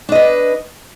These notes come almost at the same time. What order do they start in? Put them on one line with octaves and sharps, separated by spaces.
D4 D#5 B4